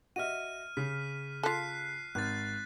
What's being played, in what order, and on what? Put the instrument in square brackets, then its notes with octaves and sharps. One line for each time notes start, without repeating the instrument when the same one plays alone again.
[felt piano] F#4 D#5 E5 [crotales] F6 D#7
[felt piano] C#3 [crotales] B6
[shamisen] F4 A4 [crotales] F#6 B6 C7
[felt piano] G#1 [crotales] F#6 A6